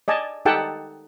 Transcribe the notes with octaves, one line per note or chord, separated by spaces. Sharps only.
D5 D#5 G#5 A5
D#4 G4 A4 F#5 G5 A5